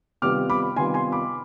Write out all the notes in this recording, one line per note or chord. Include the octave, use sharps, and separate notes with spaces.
C3 D#3 G3 B3 F4 D6 F6
B5 D6
C3 D#3 G3 B3 F4 G#5 C6
G#5 C6
B5 D6